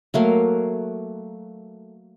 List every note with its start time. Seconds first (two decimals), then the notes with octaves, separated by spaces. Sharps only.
0.14 F#3 A3 A#3